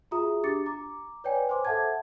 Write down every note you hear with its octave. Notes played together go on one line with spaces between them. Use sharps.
F4 F#4 G#4 E5 A#5 D#6
D4 G4 D6 A6 C#7
A#5 D6
B4 C#5 D5 G5 G#5
C5 G#5 C6 D6
A4 C5 E5 F#5 A5 G#6